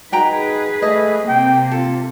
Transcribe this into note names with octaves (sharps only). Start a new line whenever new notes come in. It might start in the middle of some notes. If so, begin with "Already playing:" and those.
D#4 F#4 G#4 B4 G5 A#5
A3 D#5
C3 A#3 C4 G5
F4 A4